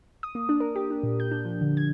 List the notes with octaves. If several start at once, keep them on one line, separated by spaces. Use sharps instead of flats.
D#6
A#3
D4
A#4
G4
D4
A#2
G6
D4
F3
D3
G#6